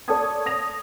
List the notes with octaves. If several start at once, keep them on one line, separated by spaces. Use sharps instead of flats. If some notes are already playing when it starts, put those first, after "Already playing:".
A4 C#5 D5 A5 D#6 G#6
D#6 A#6 F7